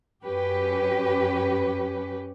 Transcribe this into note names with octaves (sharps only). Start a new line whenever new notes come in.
F#2 C#4 G4 B4